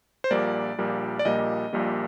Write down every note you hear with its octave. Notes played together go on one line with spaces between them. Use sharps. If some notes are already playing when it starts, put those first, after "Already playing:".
C5
A#1 A#2 G3 A#3 D5
A#1 A#2 G3 A#3
D5
A#1 A#2 G3 A#3 D#5
A#1 A#2 G3 A#3